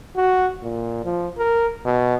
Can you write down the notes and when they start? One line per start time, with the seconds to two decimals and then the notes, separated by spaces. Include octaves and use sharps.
0.16 F#4
0.63 A#2
1.05 F3
1.38 A#4
1.85 B2